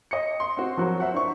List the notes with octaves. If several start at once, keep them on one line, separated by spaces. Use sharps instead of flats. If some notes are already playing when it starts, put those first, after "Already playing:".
D#5 C#7
C6
C4 F#4
F3 F#3 F#4 A#4 C5
C5 E5 F#5
D4 E4 C5 C#6